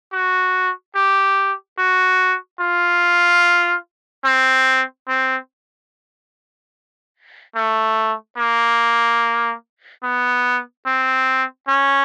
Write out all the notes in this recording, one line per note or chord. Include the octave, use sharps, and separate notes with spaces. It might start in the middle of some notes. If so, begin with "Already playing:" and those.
F#4
G4
F#4
F4
C4
C4
A3
A#3
B3
C4
C#4